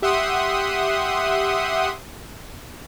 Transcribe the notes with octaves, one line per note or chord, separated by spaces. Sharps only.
G4 E5 F#5 C6 D#6